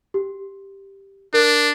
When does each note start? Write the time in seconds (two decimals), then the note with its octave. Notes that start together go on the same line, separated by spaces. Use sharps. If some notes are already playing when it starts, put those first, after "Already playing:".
0.14 G4
1.34 D4 A#4